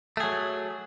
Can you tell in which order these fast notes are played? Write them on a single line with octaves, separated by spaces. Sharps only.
A3 G#4 F#3